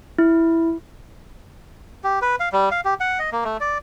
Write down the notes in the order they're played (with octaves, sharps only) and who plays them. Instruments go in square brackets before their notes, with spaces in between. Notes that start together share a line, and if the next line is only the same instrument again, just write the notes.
[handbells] E4
[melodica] G4
B4
F5
G3
F5
G4
F#5
D#5
A#3
A3
D5